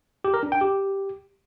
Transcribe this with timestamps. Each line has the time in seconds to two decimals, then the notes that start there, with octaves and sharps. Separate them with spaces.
0.24 G4
0.34 A#4
0.43 D4
0.52 G5
0.61 G4